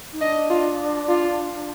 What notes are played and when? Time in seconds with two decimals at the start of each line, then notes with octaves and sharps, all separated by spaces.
0.13 D#4
0.21 D4 D#5
0.50 F4
1.09 F4